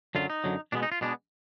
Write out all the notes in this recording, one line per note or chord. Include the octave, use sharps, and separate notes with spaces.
F#2 D3 F#3 F4
D#4
F#2 D3 F#3
B2 G#3 B3 D4
D#4
F4
B2 G#3 B3 D4